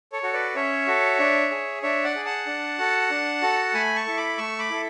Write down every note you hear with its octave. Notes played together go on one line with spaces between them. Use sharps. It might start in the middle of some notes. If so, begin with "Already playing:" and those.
A4 C#5
F#4 A4
B4 D5
C#4 C#5 E5
F#4 A4
D4
G#4
D4 C#5 E5
D5 F#5
G#4
F#5 A5
D4
F#4 A4
D4
F#4 A4
A3 G#5 B5
A5 C#6
E4 A4
B5 D6
A3 C#6 E6
B5 D6
E4 A4